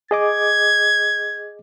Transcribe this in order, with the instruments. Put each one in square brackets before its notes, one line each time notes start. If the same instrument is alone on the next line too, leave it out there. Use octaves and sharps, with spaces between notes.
[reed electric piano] G#4 D#5 D6 [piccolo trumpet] G#6